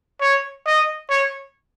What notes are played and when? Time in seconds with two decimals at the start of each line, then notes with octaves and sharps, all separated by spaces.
0.21 C#5
0.66 D#5
1.10 C#5